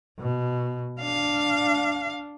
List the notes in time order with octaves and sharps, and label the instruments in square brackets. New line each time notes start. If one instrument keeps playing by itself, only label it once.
[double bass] B2
[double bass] D4 [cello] F5